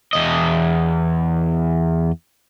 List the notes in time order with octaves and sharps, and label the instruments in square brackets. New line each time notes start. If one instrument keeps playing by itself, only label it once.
[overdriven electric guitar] E2 D#5